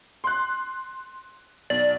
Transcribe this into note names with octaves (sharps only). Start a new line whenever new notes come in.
C6 F#6
B1 D5